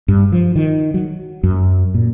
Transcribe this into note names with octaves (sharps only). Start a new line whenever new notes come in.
G2
F3
D#3
F#3
F#2
A#2